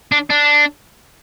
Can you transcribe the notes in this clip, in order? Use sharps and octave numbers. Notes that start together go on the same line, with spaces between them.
D4
D4